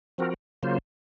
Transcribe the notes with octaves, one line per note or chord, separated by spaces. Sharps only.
F3 C4 F#4 A#4
C#3 F#3 A#3 F4 C5